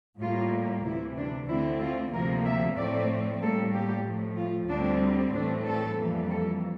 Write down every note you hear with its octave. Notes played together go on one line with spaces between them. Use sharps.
A2 G3 A#3 F4
D2 C3 E3 E4
D4
D2 D3 A3 C4 E4
F4
D2 C3 F3 A#3 A#4
E5
A2 F3 A3 C4 D5
A2 G3 A#3 A4
G4
A2 F3 A3
F4
D2 D3 G3 C4 D4
A2 E3 A3 C4 D4
A4
F2 E3 G3 A#3
A4